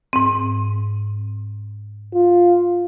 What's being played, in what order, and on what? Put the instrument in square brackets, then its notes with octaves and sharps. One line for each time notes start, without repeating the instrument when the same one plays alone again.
[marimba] G#2 C4
[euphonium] F4